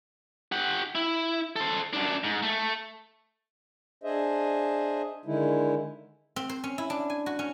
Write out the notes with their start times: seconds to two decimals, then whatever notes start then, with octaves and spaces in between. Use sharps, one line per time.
0.52 G4 F#5
0.95 E4
1.56 A4 C5
1.93 F#2 D4
2.24 G#2
2.42 A3
4.04 D4 G#4 C5 D#5 E5
5.25 D3 D#3 G#3 D#4 E4
6.36 C4
6.49 C5
6.64 C#4
6.78 E4
6.90 D4
7.10 G#5
7.26 F#4
7.39 C#4